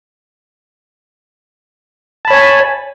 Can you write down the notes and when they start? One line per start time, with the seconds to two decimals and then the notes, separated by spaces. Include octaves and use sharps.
2.25 A5
2.28 B5
2.30 C#5
2.33 G#5